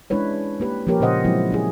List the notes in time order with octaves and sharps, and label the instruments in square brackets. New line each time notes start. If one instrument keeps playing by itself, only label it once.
[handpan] G#3 C#4 D4 E4 B4 C#5
A#3 G4 B4
F3 A#3 G4 A#4 C#5
A#2 C#3 C#4 C5 D#5 F#5
F3 F#3 G#3 C4 E4 F#4
C#4 E4 G#4